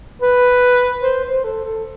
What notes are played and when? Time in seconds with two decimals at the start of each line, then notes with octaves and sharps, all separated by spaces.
0.22 B4
1.03 C5
1.24 C5
1.44 A4
1.65 A4